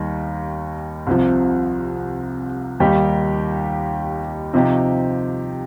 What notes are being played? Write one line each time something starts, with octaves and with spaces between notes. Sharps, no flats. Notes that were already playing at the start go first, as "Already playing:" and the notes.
Already playing: D#2 D#3 G3
C2 C3 F3
D#2 D#3 G3 D#4 G4
C3 F3 D#4 G4